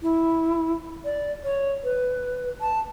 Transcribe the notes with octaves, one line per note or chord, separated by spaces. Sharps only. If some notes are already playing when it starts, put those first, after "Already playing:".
E4
D5
C#5
B4
A5